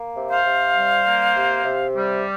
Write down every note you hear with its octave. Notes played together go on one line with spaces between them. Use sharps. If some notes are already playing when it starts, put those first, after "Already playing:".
Already playing: A#3
C3
C5 F5
C3
G3
A#3
C3
C3
G3